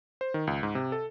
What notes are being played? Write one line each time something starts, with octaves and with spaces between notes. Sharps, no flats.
C5
D#3
C#2
G#2
C3
A4